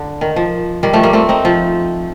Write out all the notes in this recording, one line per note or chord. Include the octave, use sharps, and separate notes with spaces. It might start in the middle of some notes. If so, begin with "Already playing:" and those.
Already playing: D3
D#3
F3
D#3 G3
F3 A3
G3 A#3
A3 C4
C4 D#4
F3